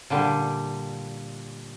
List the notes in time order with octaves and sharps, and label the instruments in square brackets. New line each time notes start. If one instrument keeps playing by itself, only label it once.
[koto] A#2 D3 G3